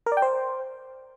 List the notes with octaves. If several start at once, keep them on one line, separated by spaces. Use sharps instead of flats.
A#4
D5
G5
C5